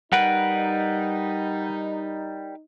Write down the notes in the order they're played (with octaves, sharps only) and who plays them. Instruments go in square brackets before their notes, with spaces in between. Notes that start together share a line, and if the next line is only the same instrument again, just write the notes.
[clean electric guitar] G3 A#4 B4 [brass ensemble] D#4 [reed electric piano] F#5